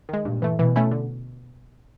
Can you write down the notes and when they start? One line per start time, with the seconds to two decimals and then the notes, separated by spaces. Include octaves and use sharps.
0.09 D#3 G#3
0.25 G2 A#2
0.42 E3 A3
0.59 B2 E3
0.76 A3 C#4 E4
0.91 D3